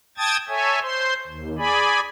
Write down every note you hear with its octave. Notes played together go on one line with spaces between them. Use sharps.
G5 A5 D#6 G#6 A6
A4 C#5 E5 G#5
C5 C6
D#2
G#4 D5 G#5 B5